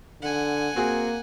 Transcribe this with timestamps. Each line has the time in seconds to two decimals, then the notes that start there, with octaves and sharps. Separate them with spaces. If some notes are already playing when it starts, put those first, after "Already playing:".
0.22 D3 F#5 G#5
0.76 A#3 C4 F#4 G#4